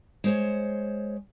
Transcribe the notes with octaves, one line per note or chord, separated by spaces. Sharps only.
G#3 C5 C#5